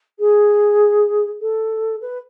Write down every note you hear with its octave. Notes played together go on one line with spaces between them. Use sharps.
G#4
A4
B4